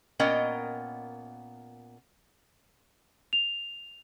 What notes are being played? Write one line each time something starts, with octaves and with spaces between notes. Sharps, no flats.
A#2 B3 C#4 A#4 D#5 G5
F7